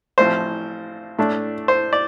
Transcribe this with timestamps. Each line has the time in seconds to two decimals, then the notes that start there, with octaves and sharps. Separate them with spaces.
0.18 A1 A2 F3 C4 C5
1.19 A2 A3 D4
1.68 C5
1.93 D5